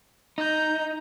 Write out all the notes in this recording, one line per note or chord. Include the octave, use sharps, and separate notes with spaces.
D#4 A#5 G6